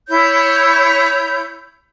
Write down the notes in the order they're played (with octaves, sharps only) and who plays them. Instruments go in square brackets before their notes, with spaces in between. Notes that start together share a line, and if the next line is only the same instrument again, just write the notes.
[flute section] E4 C#5 G6